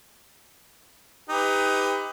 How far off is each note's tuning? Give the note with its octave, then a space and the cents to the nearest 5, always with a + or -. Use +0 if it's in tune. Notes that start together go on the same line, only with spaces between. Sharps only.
D#4 +20 G4 +30 B4 +20